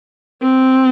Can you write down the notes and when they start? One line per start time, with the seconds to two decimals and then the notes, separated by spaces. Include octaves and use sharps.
0.42 C4